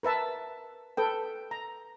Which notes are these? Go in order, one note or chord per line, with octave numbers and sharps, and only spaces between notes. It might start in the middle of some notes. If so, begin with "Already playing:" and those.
A#4 B4 E5 A5
A4 B4 G5
A#5